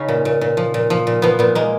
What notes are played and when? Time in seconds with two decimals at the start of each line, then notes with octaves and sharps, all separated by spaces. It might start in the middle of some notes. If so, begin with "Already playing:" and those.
Already playing: C#3 C#4 D#4
0.09 A#2
0.25 A#2
0.41 A#2
0.57 F3
0.74 A#2
0.90 F3
1.07 A#2
1.22 F3 B3
1.39 A#2 B3
1.55 G#3 A#3